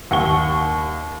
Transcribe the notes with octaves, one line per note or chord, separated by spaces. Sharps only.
D#2 F#5 C#6 G7